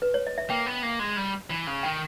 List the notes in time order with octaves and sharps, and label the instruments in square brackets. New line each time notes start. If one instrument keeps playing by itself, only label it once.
[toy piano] B4
C#5
D#5
E5
[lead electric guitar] A#3 [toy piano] G5
[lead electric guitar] B3
A#3
G#3
G3
E3
C#3
[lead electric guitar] D#3 [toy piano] G5